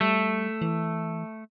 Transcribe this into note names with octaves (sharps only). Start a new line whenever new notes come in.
G3 A3
E3